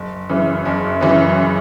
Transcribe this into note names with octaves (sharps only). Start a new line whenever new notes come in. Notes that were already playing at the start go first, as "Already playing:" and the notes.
Already playing: F#1
F#2 C#3 E3
F#1
F#2 C#3 E3